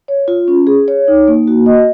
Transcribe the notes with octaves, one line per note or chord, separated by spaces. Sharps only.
C#5
F4
C#4
G#4
C#5
D#4
A#3
F#4
D#5